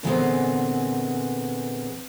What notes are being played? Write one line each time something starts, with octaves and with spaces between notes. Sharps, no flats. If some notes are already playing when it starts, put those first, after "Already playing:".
A#2 D3 E3 G#3 B3 C4